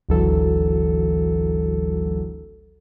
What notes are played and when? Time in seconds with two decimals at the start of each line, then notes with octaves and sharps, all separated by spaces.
0.09 G#1 D2 E3 F#3 A4